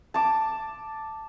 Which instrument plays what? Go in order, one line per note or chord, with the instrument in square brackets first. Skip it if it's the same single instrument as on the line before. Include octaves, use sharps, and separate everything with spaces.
[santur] A5 D6